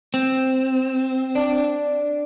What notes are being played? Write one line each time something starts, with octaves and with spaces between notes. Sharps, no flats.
C4
D4